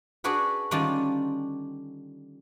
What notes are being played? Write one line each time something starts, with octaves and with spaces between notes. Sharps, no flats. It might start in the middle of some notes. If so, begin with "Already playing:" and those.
D4 F#4 G#4 B4 F#5
D3 D#3 G3 C#4 D4 F4